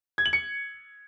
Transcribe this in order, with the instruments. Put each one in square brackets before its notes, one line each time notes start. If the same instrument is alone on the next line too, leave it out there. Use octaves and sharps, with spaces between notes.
[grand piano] G#6
F#7
C#7